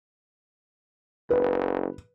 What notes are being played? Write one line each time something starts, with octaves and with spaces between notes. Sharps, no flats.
F#1 B4